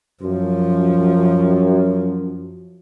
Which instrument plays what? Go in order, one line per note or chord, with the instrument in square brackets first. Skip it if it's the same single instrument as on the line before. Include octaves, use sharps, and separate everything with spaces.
[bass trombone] F#2 [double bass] F3